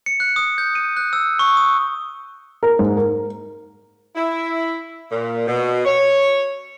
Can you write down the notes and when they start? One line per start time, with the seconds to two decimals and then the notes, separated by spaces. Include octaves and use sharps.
0.06 C#7
0.20 F#6
0.36 D#6
0.58 G6
0.75 D#7
0.97 F#6
1.13 E6
1.39 C#6
1.57 D#6
2.63 A#4
2.79 G#2
2.97 A#4
4.15 E4
5.10 A#2
5.47 B2
5.85 C#5